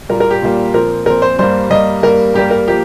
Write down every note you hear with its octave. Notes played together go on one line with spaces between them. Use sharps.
A#2 G3 A#3 A#4
A#4
G4
A#2 G3 A#3
A#2 F3 C4 A#4
A#2 F3 C4 A#4
C5
G2 G3 A#3 C5
G2 G3 A#3 D#5
G2 G3 A#3 A#4
G2 G3 A#3 G4
A#4
F3 A#3 G4